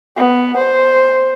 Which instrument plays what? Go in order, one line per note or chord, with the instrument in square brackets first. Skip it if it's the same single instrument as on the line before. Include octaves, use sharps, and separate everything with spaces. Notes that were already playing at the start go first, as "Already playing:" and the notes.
[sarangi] B3
C5